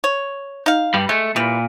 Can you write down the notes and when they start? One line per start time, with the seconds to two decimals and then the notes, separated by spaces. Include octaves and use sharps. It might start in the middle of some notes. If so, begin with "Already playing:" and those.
0.04 C#5
0.66 D#4 F5
0.94 G2 G3
1.09 G#3 A3
1.36 A#2 E3 G3